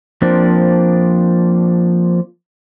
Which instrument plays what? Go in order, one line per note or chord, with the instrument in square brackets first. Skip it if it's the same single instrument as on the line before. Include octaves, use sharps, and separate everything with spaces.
[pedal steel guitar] F3 A#3 C4 D4